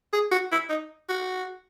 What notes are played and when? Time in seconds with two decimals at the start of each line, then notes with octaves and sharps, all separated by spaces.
0.13 G#4
0.31 F#4
0.52 E4
0.70 D#4
1.09 F#4